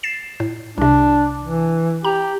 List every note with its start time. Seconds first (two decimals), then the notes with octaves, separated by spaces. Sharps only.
0.03 A6 C7 E7
0.40 A2
0.78 C2 C3 D4
1.42 E3
2.04 G4 A#5